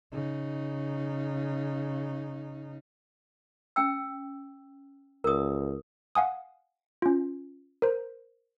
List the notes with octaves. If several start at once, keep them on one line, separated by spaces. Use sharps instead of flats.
C#3 D#4
C#4 G5 E6
C#2 A#4 D#6
F5 F#5 G#5 D#6
C#4 F4
A#4 C5